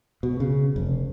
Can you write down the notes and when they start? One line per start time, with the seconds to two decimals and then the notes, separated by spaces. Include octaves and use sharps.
0.23 B2
0.40 C#3
0.76 F1